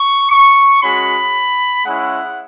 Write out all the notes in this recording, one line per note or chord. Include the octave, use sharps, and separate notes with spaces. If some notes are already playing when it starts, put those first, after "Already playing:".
Already playing: C#6
C#6
G#3 C#4 F#4 B5
G#3 C#4 E4 F#5